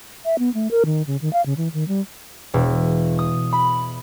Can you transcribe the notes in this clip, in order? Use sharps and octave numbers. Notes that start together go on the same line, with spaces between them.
E5
B3
A3
A#4
D#3
C#3
D#3
F5
C#3
E3
D#3
G3
E1
D#6
B5